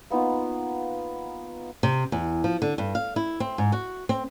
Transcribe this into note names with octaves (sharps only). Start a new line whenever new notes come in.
A#3 B3 D#4 F4
C3
E2
F3
D3
G2
F5
E4
C4
G#2
F#4
C4